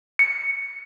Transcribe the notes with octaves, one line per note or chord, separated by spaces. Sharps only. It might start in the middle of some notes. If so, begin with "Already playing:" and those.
C#7